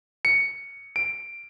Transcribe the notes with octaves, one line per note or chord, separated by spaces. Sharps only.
C#7
D7